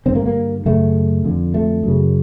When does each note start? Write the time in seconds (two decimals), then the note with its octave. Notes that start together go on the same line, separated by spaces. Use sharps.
0.06 G2 D3 C4
0.15 A#3
0.26 A#3
0.66 F#2 C#3 A3
1.25 F2 D3
1.54 A3
1.83 F#2 C#3